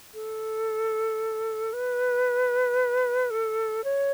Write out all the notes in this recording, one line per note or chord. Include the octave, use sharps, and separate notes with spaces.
A4
B4
A4
C#5